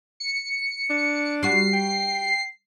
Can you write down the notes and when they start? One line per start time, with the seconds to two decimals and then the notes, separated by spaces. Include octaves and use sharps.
0.20 C#7
0.90 D4
1.43 G3 F#4 C7
1.73 G5